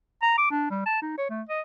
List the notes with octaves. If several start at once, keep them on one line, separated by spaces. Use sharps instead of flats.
A#5
D6
D4
G3
A5
D#4
C#5
A3
D#5